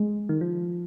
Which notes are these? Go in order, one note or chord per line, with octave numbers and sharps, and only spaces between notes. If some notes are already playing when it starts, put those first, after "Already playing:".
Already playing: G#3
D#3
F3